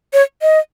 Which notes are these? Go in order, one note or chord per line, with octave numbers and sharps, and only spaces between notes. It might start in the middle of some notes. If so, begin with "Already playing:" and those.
C#5
D#5